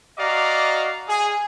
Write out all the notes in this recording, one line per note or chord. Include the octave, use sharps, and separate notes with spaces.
F#4 D5 D#5 F5 A#5 D6
G#4